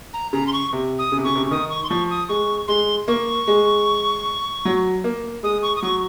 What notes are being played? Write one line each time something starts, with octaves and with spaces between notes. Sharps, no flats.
A#5
C#3 A#5
C6
C#6
C3
D#6
C#3
C3
C#3 C#6
C3
C#3
D#3 D#6
C#6
C6
F3 C#6
D#6
G#3 C#6
G#3 C6
A#3 C#6
G#3
F#3
A#3
G#3 D#6
C#6
D#6
F#3 C#6